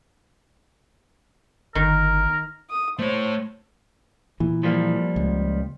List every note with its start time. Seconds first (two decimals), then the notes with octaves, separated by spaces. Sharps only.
1.75 G1 D#3 A#4
2.70 D#6
2.99 A3 C5 C#5
4.40 A#2 E3
4.63 F3 G3 A#3
5.16 C#2